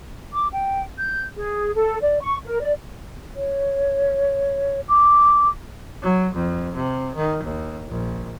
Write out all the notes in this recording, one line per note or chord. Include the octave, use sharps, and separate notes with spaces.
D6
G5
G6
G#4
A4
D5
C#6
A#4
D5
C#5
D6
F#3
F2
C3
D#3
D#2
A#1